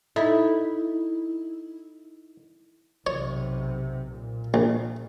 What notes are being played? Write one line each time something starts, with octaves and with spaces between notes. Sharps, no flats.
D#4 E4 A4
B1 C3 C#5
A#2
A#1